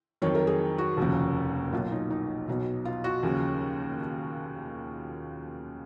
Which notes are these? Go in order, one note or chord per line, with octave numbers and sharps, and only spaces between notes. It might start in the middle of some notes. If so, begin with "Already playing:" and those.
F2 D#3 F#3 C#5
A#4
G#4
F#4
F1 D#2 C#3 F3
B1 A#2 F#3 F4
D#4
D#4
B1 B2 F#3
F4
F#4
D#2 C#3 F3